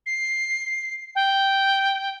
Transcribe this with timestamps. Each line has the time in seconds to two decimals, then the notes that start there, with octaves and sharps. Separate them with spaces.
0.06 C7
1.15 G5